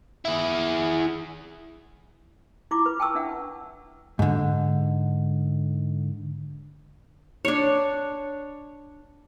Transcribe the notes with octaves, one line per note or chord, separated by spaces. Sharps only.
E4 G#4
E4 F4 D6
B4
G5 A5 C#6 E6
D4 E5 F#5
G#2 D3
D4 C#5